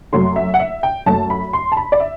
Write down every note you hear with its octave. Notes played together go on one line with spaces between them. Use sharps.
F#2 F#3 A3 C6
E5
F#5
E5
G5
F#2 F#3 A3 A5
B5
C6
A5
B5
D5
E5